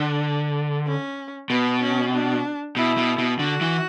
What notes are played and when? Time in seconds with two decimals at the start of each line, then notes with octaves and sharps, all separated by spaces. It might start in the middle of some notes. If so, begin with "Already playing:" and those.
Already playing: D3 D4
0.87 C#4
1.50 B2 B3
1.82 C#4
2.13 D4
2.76 B2 E4
2.98 B2
3.18 B2
3.39 D3 F#4
3.61 E3